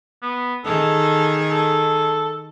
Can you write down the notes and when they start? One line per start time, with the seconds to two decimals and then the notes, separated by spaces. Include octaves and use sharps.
0.22 B3
0.65 D#3 G#4 A4
1.50 A4